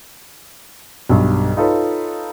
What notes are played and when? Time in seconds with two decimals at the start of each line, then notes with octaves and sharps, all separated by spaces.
1.09 B1 G2
1.57 D#4 F4 A4 B4 C#5